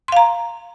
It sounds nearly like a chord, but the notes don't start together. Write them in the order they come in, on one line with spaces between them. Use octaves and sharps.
C6 F5 A#5